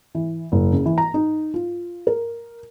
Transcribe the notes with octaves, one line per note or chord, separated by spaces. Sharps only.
E3
F#1
C#3
E3
A#5
D#4
F4
A#4